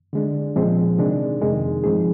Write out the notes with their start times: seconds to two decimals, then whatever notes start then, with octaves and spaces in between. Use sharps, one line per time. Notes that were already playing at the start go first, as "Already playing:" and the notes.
0.13 D3 G#3 D4
0.56 A#2 F3 G#3 C4
0.98 C3 D#3 G#3 D4
1.41 F2 C3 D#3 G#3 C4
1.84 G2 F3 C4 D#4 G#4